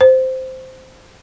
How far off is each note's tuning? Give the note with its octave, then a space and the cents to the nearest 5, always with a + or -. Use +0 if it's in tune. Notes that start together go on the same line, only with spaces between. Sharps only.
C5 -5